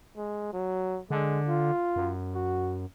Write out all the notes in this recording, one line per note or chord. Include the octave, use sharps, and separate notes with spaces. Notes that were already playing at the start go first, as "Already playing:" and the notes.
G#3
F#3
D3 G#3
F4
F#2
F#4